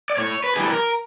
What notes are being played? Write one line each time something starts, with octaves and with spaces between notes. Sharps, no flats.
D5
A2 C#5
B4
E3 G3 G#4
A4
A#4